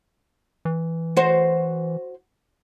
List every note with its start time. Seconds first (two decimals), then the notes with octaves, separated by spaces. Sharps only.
0.65 E3
1.17 F#4 C5